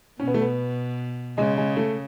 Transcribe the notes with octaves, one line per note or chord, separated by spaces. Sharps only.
B2 C#4
B3
A3
B3
C#3 G#3
G#3
A3